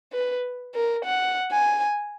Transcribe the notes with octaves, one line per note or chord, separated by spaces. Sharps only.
B4
A#4
F#5
G#5